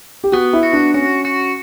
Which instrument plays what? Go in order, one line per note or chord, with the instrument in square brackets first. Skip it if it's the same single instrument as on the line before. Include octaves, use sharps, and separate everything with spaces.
[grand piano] G4
[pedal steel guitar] B3 [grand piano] F#4
[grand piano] E4
[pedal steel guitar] F#4
[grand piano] D4
[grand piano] C#4 [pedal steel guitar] F#4
[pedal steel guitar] F#4